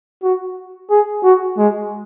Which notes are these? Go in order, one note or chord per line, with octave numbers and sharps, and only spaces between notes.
F#4
G#4
F#4
G#3